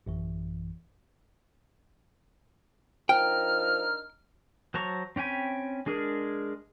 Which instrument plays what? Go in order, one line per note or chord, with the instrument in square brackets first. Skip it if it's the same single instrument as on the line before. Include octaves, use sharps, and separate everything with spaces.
[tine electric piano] A1 F#2 E3
[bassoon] F3 [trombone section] D4 D#4 A#4 [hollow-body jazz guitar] G5 [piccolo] F6
[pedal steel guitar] F#3 C5 A5 A#5 C#6
C4 C#4 G5 G#5 B5
G#3 D4 G#4 A#4